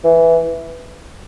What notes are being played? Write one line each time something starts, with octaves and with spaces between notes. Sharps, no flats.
E3